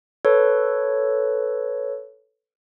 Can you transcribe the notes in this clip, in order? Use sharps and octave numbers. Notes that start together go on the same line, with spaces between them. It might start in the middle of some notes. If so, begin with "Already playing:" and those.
A4 B4 C#5